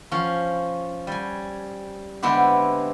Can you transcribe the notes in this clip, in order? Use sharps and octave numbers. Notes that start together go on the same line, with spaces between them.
F3 C#4
G3 G#5
D3 G#3 B3 C4 E4 G4